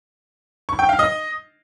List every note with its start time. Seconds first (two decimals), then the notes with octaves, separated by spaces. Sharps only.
0.69 C#6
0.79 G5
0.89 F5
0.99 D#5